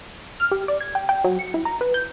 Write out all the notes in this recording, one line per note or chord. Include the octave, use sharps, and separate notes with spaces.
F6
G4
D5
G#6
G5
G5
F#3
C#7
E4
A#5
B4
G6